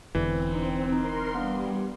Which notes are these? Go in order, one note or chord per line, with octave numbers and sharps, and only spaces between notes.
E1 E2 D3 E3 C4
D4 D#4
D#4 A#4 C6
G3 B3 D4 F5